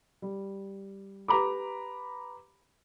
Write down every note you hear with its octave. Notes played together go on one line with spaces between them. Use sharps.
G3
G4 B4 A#5 B5 D6